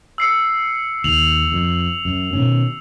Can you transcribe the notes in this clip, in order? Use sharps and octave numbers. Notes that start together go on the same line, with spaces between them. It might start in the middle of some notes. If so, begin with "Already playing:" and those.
E6 C7 C#7
D#2 F7 F#7
F2
F#2
B2 D#3 C#4